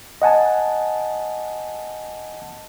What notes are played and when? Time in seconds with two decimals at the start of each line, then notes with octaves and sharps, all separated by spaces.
0.22 D#5 F#5 G#5 A5